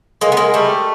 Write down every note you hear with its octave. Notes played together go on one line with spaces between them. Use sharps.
G#3 A#3
B3
G#3 A#3
G3 A3